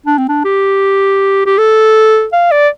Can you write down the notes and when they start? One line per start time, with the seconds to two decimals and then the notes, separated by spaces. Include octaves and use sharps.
0.06 D4
0.18 C4
0.29 D4
0.45 G4
1.46 G4
1.58 A4
2.33 F5
2.52 D5